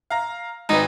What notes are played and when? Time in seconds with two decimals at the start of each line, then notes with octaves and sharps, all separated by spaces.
0.10 F5 A#5
0.69 G#1 D#4 B4